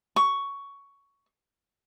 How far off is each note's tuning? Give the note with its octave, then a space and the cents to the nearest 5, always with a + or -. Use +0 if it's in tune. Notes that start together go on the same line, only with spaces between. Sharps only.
C#6 +10